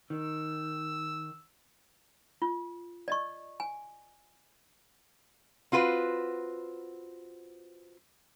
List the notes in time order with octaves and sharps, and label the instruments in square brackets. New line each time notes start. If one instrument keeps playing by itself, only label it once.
[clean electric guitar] D#3 [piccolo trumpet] E6
[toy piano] F4
D5 D#5 C#6
G#5
[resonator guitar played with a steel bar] C4 F4 F#4 B4